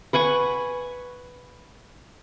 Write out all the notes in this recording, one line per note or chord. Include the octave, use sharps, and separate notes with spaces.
B4 F#5 G#5 C#6